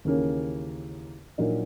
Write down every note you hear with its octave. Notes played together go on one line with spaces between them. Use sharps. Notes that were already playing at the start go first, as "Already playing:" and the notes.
D#2 C#3 E3 A#3 C#4
A#1 A#2 F#3 A#3 D#4